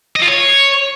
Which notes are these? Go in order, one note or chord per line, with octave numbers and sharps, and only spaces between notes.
D#5
F4
C#5